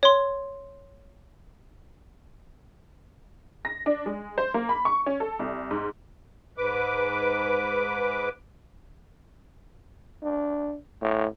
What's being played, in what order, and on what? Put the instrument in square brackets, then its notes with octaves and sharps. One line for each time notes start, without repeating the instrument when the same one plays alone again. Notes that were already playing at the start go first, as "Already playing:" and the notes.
[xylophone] C#5 C6
[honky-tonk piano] A#6
D4
G#3
C5
A#3
B5
C#6
C#4
A4
C2
G#2
[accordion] G#2 B4 D6
[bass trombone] D4
A2